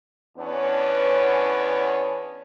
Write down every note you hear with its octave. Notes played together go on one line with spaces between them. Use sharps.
E2 B3 C#4 D4 B4 C#5